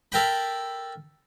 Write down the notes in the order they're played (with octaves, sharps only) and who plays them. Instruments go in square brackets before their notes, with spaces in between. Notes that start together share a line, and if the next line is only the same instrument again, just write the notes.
[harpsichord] A4 A#4 G5 B5